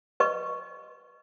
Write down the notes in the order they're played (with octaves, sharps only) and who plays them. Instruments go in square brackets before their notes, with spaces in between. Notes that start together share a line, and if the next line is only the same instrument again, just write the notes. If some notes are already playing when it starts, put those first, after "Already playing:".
[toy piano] B4 D#5 C#6